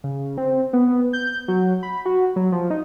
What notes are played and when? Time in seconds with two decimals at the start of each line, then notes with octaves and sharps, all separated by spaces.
0.04 C#3
0.38 C4
0.73 B3
1.13 G6
1.48 F#3
1.83 B5
2.05 F#4
2.36 F#3
2.52 F3
2.70 D#4